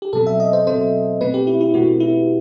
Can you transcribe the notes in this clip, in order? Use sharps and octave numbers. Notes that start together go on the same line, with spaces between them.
G4
B2 F#3 C4 A4
E5
D#5
C5
B2 F#3 C4 C5
B2 A3 C4 B4
G4
E4
E4
B2 A3 C4 F#4
E4